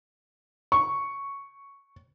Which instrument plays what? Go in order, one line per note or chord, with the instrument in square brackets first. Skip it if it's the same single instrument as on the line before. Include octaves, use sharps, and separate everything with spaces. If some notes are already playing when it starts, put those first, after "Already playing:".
[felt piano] C#6